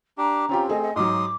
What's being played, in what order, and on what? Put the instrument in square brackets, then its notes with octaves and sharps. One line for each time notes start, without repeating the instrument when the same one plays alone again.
[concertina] D4 G4 [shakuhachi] A#5
[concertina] C4 [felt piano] C#4 F4 G4
[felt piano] A3 G#4 [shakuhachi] D#5
[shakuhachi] D#5
[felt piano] G#2 F#3 [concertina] C6 D#6 [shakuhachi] D6